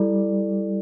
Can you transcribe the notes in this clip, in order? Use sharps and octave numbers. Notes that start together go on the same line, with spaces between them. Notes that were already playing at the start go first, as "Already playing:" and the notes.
Already playing: G3 E4 A4 D5